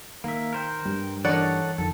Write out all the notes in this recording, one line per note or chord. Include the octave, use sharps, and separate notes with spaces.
D#3 A#3 E5
A#4 C5 G5
G2 G3
D#3 E3 D4 A4 C#5 D5 F#5
F2 D#3 A4